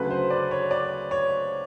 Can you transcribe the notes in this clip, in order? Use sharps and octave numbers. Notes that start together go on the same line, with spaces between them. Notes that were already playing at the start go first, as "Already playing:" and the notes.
Already playing: D2 C#3 F#3 A3 B4
C5
D5
C#5
D5
C#5